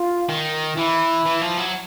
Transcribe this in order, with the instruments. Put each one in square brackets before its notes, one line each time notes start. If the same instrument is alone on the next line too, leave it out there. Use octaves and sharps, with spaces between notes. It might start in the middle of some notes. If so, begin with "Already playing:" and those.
Already playing: [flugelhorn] F4
[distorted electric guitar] D#3
[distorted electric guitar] E3 [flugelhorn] E4
[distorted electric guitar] E3
F3
F#3